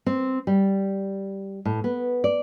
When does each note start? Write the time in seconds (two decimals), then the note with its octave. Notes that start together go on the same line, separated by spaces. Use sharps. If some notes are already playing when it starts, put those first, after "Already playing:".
0.06 C4
0.47 G3
1.65 A2
1.84 B3
2.24 D5